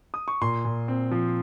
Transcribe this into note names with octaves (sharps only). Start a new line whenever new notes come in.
D#6
C#6
A#2 C6
A#2
C4
F3